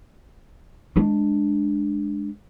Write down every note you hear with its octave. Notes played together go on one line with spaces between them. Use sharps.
G#3 D4